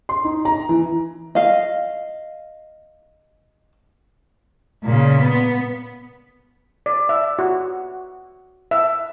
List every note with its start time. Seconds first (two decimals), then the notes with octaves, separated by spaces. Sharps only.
0.09 C6
0.25 D#4
0.45 A#5
0.69 E3
1.35 D#5 F5
4.84 A#2 C#3
5.22 B3
6.86 D5
7.09 E5
7.39 F#4
8.71 E5